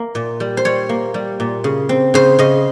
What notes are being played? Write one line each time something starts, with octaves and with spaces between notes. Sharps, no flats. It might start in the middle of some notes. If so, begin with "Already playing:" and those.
Already playing: A#3
A#2
G3
C5
G3 C#5
A#3
G3
A#2
C#3
C4
C#3 C5
C#3 D#5